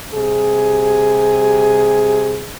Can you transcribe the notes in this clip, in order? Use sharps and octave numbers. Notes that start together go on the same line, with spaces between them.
C3 G3 G#4